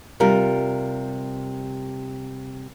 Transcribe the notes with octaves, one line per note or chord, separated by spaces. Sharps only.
C3 G3 F4 A#4